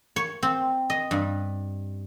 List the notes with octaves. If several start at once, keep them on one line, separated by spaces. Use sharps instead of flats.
C#5
C4
D#5
G2